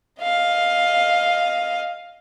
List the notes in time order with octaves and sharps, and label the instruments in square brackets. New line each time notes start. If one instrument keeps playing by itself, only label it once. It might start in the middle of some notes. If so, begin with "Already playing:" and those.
[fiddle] D#5 F5